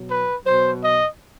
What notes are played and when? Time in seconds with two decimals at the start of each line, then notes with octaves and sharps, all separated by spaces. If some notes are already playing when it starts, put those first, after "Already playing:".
Already playing: B2 F#3
0.09 B4
0.45 B2 F#3 C5
0.82 D#5